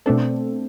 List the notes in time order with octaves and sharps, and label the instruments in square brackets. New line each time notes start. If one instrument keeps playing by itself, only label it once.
[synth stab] B2 A3 D4 A4 [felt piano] C4